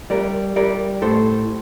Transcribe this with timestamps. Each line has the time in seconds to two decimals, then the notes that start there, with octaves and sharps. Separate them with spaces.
0.10 G3 A#4 D5
0.56 G3 A#4 D5
1.02 A2 A4 C5